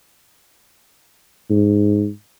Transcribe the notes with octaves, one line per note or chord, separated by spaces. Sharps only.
G#2